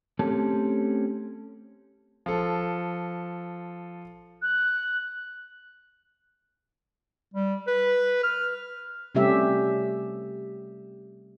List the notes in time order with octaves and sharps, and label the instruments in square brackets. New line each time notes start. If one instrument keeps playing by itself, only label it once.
[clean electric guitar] A3 C4 C#4 G4 A4
[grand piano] F3 A4
[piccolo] F#6
[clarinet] G3
B4
F6
[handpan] C3 G3 A3 C#4 G4 E5